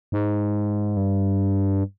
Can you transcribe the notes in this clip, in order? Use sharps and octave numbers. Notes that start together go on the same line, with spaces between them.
G#2
G2